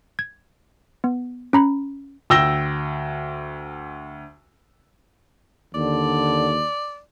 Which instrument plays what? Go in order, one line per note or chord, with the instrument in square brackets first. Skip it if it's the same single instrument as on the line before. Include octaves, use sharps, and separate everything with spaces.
[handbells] G#6
B3
C#4 A#5 B5
[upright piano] D2 G5 E6 A#6 G7
[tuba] D#2 [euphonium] D3 [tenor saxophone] D5